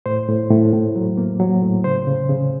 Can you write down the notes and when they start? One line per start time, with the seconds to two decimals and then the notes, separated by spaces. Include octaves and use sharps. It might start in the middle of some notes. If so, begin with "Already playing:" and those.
0.06 A2 C5
0.29 A2
0.50 A2
0.73 A2
0.95 F#3
1.17 A#3
1.40 F#3
1.62 A2
1.84 C#3 C5
2.07 C#3
2.29 C#3